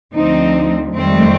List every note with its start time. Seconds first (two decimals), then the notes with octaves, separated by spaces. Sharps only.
0.14 D2 D3 F3 C4 D#4
0.95 F2 D#3 G3 A3 C4